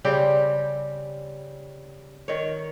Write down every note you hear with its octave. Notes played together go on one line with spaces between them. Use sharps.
C#3 G3 C4 G4
D#3 C#5